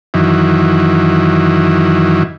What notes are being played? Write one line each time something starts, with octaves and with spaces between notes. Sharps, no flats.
F#2 D#3 E3